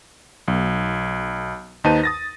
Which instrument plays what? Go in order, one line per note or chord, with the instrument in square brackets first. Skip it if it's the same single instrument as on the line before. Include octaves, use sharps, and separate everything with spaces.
[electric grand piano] B1
D#2 D#4 B4 C5 A5 D#7
D#6 A6 A#6